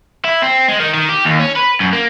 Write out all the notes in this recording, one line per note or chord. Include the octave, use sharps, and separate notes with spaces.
E4
C4
G#3
D#3
D#3
G4
D#2
C#4
B4
F#2
A#3